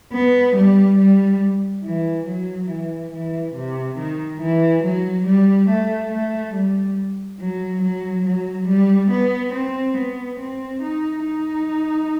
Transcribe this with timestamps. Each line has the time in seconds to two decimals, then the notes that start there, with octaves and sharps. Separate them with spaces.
0.13 B3
0.56 G3
0.98 G3
1.84 E3
2.27 F#3
2.70 E3
3.13 E3
3.55 C3
3.98 D#3
4.41 E3
4.84 F#3
5.26 G3
5.70 A3
6.11 A3
6.54 G3
7.40 F#3
7.82 F#3
8.26 F#3
8.68 G3
9.11 B3
9.54 C4
9.97 B3
10.39 C4
10.82 D#4
11.25 D#4